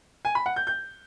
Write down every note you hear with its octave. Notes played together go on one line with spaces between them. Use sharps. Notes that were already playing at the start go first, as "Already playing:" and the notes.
G#5
B5
F#5
G6
G6